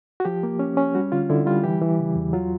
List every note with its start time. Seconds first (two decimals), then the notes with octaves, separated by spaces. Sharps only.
0.20 F#4
0.25 F3 G4
0.43 A#3
0.59 C#4
0.77 C#4
0.95 G3 F#4
1.12 D3 F4
1.30 D3 E4
1.46 G3 F4
1.64 E3 G4
1.81 E3
1.99 C#3
2.15 E2
2.33 F#3 F4